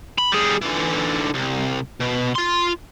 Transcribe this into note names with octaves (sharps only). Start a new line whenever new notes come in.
B5
G3 G#4
D3 E3
C2
B2
F4 C6